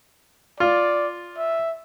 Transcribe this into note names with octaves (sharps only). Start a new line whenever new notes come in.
F4 D5
E5